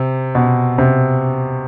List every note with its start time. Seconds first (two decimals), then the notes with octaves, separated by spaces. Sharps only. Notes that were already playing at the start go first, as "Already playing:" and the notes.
Already playing: C3
0.35 B2
0.78 C3